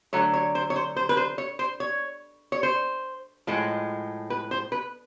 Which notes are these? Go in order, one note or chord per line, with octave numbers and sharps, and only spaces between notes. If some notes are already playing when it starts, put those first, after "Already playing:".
D3 F#3 A3 C#5
C#5
C5
C#5
C5
C5
B4
C5
C#5
C5
C#5
C#5
C5
A2 F3 G#3
B4
C5
B4